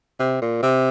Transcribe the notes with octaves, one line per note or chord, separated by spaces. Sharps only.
C3
A#2
C3